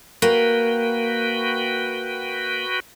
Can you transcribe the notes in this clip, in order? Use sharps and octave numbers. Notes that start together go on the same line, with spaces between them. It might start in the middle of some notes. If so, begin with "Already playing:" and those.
A#3 F#4 B4 G5